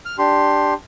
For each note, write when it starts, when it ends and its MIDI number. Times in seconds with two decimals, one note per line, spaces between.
0.05 0.16 89
0.19 0.73 62
0.19 0.73 67
0.19 0.73 84